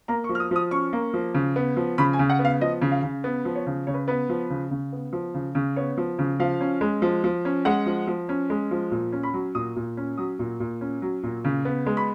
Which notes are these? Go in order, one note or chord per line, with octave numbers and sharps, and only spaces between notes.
A#3 A#5
C#6
F3
F6
D#6
F3 D#6
C#4 C#6
A#3
F3
C#3
B3
F3
C#3 B5
G#5
C#3
F#5
B3
F5
F3 D#5
C#3
F5
C#3
B3
F3
C#5
C#3
C#3 C#5
B4
B3 B4
F3
C#3
C#3
B3
F3
C#3
C#3
B3 C#5
F3
C#3
F3 F5
C#4
G#3
F3
F3
C#4
G#3 F#5
F3
F3
C#4
G#3
F3
A#2
C#4
B5
F#3
A#2 D#6
A#2
C#4
F#3 D#6
A#2
A#2
C#4
F#3
A#2
C#3
B3
G#3
B5